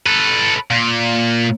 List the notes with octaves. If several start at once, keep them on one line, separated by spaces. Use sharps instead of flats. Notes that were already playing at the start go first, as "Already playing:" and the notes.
A4 B4
A#2